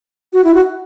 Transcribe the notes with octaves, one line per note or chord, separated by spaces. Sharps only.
F#4
E4
F#4